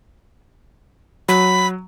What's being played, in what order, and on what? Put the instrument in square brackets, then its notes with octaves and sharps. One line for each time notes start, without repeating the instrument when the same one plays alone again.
[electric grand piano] F#3 [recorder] B5